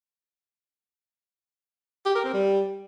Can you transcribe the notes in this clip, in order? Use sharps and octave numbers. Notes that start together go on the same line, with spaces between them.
G4
A#4
C4
G3